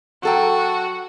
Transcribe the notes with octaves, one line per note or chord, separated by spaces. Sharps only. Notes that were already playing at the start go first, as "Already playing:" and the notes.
F#3 F#4 A4 G5